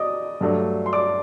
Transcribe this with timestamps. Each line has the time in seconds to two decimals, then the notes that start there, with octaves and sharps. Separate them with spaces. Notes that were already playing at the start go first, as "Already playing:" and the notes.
Already playing: D5 D#5 D6 D#6
0.41 G2 F#3 A3 D4
0.86 C6
0.93 D5 D6